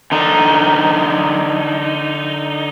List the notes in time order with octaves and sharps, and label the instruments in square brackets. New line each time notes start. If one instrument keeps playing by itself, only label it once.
[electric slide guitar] D3 D#4